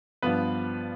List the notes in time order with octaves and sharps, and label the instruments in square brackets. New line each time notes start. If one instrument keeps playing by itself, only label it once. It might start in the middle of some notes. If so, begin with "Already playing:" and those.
[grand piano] G2 F3 B3 B4